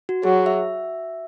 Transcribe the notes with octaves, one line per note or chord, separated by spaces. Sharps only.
F#4
F#3 G#4
E5